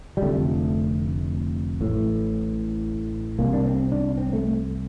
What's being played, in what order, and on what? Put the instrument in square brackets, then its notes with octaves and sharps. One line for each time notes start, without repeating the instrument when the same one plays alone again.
[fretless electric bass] G3
F1 F2 D3 A3
A1 A2
C2 C3 A#3
D4
C4
D4
C4
A3